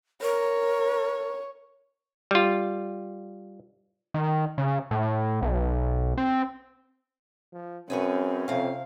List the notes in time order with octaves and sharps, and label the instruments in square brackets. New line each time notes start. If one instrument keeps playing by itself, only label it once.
[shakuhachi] A#4 [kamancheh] C#5
[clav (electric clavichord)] G3 F4
[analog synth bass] D#3
C#3
A2
B1
C4
[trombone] F3
[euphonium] F#2 [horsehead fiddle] C4 [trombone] C#4 [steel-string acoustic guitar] G#4 B4 C#5
[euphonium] F2 [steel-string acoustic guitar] C3 F5